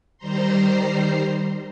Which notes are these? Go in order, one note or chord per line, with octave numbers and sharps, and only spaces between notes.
D#3 G3 C5 A#5 C6